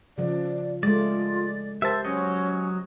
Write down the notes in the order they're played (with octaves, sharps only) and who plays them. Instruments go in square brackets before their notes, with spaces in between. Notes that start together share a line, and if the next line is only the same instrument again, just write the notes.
[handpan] C#3 F3 [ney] D5
[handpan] G#3 A3 [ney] F4 [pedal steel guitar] D5
[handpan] G4 C5 [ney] A#4 [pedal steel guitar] E5 A5
[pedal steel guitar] F#3 C#5 D#5 [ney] C#4